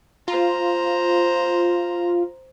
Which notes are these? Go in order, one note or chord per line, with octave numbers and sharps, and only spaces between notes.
F4 C5 A#5